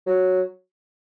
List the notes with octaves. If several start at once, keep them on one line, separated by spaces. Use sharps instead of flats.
F#3